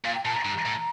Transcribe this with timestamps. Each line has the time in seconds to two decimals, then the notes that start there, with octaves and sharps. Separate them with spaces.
0.05 A#2 F5
0.15 G5
0.25 A#2 A5
0.34 A#5
0.45 G2
0.66 A2